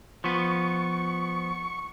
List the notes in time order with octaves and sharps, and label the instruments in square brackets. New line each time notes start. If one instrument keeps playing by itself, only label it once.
[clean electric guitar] F3 B3 [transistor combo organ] C#6